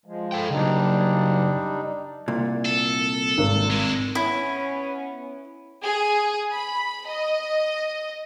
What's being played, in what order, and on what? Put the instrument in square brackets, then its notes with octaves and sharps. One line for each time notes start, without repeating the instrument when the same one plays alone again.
[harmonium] F3 G#3
[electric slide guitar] A4 G5
[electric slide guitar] C#3 F#3 [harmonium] G3 D4 D#4
[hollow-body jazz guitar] C2 A#2
[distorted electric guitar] A4
[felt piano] G#1
[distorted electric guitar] G#3 E4
[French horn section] B3 C#4 [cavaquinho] E4
[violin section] G#4
B5
D#5